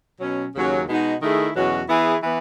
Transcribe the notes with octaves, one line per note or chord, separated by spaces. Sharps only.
B2 F#3 C#4
D#2 C#3 F#3 C#4
B2 G#3 D#4 F#4
D#3 A3 E4 G#4
E2 B2 F#3 C#4 F#4
E3 B3 E4 G#4
E3 B3